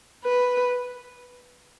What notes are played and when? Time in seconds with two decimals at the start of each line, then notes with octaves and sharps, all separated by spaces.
0.25 B4